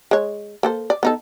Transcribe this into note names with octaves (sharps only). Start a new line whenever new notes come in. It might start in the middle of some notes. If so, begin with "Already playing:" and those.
G#3 C#5
A#3 A4 C5
D5
B3 D#4 A4